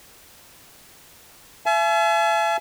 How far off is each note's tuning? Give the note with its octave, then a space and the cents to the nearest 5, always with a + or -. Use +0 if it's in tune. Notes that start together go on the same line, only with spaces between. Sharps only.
E5 +40 G#5 +45